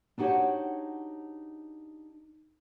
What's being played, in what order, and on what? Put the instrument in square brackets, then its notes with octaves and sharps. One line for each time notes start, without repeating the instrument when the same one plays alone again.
[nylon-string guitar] D4 D#4 F#4 G4 C5 C#5